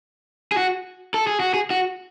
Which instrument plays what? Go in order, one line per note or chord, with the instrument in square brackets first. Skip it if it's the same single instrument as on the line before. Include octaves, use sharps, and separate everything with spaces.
[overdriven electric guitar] G#4
F#4
A4
G#4
F#4
G#4
F#4